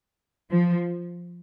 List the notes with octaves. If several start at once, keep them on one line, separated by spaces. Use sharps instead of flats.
F3